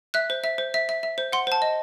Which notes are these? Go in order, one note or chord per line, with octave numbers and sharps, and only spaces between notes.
E5 F#6
C5
E5
C5
E5
E5
E5
C5
F#5 C6
C5 A5
D#5